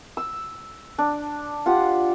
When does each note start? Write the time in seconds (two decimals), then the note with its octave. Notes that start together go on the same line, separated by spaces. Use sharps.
0.17 E6
0.98 D4
1.66 F4 G4 F#5